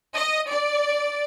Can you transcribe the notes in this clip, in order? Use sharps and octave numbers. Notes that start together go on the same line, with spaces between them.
D#5
D5